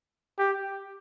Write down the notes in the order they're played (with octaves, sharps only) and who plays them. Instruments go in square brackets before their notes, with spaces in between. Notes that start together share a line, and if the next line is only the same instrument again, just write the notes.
[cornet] G4